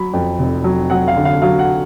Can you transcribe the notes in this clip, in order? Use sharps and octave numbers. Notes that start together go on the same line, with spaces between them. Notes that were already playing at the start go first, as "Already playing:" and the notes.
Already playing: F#3 B5
F2
F1
F#3
F#3 F#5
F5
D3
F5
F#3 F5
F#5